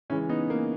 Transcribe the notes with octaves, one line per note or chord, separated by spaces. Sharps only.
C#3 E3 G#3 C#4 E4
B3 D#4
A#3